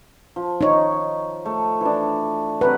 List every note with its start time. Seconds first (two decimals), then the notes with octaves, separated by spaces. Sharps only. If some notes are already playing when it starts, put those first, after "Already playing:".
0.36 F3
0.61 D#4 C#5
1.46 A3
1.81 E3 D4
2.61 C3 F#3 B4 F#5